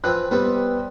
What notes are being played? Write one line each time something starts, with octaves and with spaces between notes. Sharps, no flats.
E3 F3 C4 F#6
C3 G3 B3 C4